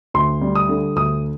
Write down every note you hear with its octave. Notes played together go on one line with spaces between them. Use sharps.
D2 C6
G3
D#6
D3
D2 D#6